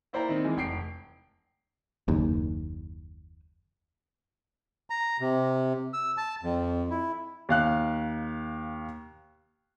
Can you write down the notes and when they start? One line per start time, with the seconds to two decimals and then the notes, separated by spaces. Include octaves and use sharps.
0.13 A#3 E4 C5 D5 G5 A#5
0.29 D#3 C4
0.45 E3 G#3
0.57 F1 G5 C7 D7
2.08 F#1 D#2
4.90 A#5
5.21 C3
5.94 E6
6.17 A5
6.43 F2
6.90 E4
7.49 D#2 F5 F#6